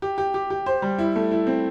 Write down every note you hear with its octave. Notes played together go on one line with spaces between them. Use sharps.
G4
G4
G4
G4
C5
G3
E4
A3
E4
C4